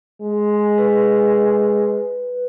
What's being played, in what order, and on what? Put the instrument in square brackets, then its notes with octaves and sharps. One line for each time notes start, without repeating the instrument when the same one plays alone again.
[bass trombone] G#3
[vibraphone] B4